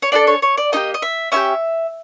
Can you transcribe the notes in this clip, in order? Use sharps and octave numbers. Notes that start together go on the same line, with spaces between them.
C#5
D4 F#4 A4 D5
C#5
C#5
D5
A#3 D#4 G4 D#5
D#5
E5
C#4 E4 G4 E5